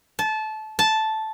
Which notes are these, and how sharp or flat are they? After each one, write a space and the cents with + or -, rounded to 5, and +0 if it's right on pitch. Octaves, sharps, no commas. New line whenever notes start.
A5 -20
A5 -5